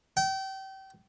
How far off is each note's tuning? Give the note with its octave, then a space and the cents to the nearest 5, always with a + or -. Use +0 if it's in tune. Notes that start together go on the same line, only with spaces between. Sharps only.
G5 -30